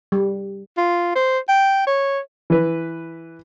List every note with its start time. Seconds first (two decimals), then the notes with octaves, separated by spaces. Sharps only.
0.12 G3
0.77 F4
1.15 C5
1.49 G5
1.86 C#5
2.50 E3 B4